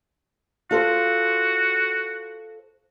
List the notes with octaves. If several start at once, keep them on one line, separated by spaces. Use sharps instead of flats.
F4 F#4 A4 C5